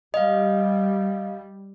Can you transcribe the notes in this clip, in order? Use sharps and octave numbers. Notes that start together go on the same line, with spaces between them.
G3 D#5 F5